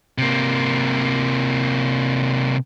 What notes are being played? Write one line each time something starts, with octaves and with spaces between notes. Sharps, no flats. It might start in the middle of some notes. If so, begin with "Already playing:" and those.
C3 A#3